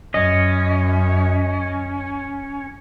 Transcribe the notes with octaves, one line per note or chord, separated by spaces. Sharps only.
F#2 C#4 D#5